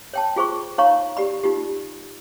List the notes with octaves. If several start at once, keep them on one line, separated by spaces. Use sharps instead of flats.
C#5 G5 A5
F4 G#4 C5 C#6
D#4 C#5 F5 A#5 C#6
G4 D5 B5
D#4 F4 G4